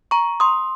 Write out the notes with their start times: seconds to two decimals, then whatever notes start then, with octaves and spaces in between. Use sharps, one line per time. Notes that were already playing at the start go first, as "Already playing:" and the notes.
0.11 A#5 C#6
0.40 C6 D#6